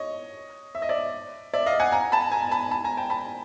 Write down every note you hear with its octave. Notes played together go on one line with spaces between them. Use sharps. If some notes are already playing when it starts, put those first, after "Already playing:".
Already playing: C#5 D#5
E5
D#5
D5 E5
D5 E5
D#5 F5
F#5 G#5
G#5 A#5
A5 B5
G#5 A#5
A5 B5
A5 B5
G#5 A#5
G5 A5
A5 B5